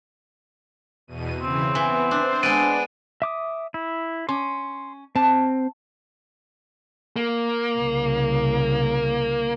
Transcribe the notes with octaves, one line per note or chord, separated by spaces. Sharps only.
E2 B2 D#7
C#3 E3 C4
E3 B3
D4 C5
G#3 B3 D4 A6 D7 D#7
E5 D6 D#6
E4
C#4 C6
C4 A5
A#3
C2 C#3